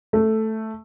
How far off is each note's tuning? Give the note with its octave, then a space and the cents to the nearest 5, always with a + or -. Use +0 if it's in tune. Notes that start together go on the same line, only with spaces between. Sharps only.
A3 +0